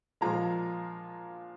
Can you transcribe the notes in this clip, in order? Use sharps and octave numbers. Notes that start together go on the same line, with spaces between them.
A#2 F3 G#3 A#5